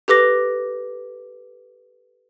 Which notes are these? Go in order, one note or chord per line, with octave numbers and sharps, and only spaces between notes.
G4 A4 B4 D6 A#6